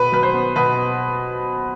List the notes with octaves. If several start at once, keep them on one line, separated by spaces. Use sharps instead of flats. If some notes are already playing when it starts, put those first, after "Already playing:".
Already playing: B2 B4
F#3 B4
C5
B3
B2 B4